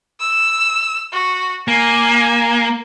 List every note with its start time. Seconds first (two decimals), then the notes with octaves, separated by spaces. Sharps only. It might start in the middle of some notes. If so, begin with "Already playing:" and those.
0.20 E6
1.13 F#4
1.68 A#3 G#5